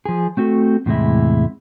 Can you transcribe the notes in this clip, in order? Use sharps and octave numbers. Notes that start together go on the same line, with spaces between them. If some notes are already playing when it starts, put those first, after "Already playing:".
F3 G#4
A3 C4 F#4 A4
E2 A2 C3 G#3 E4